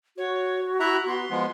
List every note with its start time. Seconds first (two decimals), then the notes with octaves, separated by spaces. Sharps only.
0.17 F#4 C#5
0.80 E4 E5 A#5 F#6
1.07 B3 C6
1.30 F3 G#3 B3